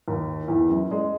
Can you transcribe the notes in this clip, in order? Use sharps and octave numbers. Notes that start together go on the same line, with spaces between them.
D#2
E2
F#2
G#3